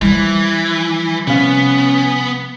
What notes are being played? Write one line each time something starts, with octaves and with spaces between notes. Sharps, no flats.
E3 F3 G3
C3 B3 C#4 F5